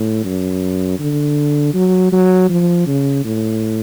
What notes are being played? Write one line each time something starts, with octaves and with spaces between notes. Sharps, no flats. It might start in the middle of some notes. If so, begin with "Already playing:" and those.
Already playing: A2
F#2
D3
F#3
F#3
F3
C#3
A2